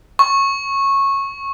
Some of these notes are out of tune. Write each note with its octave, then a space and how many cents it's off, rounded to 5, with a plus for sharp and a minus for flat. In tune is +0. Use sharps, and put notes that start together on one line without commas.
C#6 -15